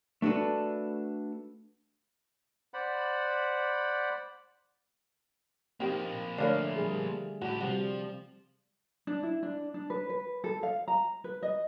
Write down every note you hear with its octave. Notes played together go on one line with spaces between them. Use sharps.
A3 D4 F#4 A4 B4
C5 D5 F#5 B5
D#3 F3 A#3 C4 G4
D3 A3 D4 A#4 C#5 F5
G3 G#4
A2 F#4 G4
C3 F3 G3 F#4
D4
E4
D4
D4
B4
B4
A4
F5
A#5
B4
D#5